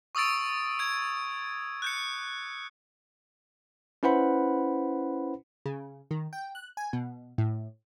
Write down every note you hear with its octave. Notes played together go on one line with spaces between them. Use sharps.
C#6 D#6 E6 A6 D7
G#6 D7
F#6 G6 C#7
C#4 E4 B4 C5 F#5 B5
C#3
D#3
G5
F#6
G#5
B2
A2